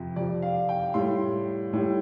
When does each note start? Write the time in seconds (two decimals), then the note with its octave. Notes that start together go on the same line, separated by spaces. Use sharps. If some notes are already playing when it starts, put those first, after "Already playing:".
Already playing: F2 C3 F3
0.16 F2 C3 F3 D5
0.42 F5
0.69 G5
0.94 A2 G3 C6
1.73 A2 G3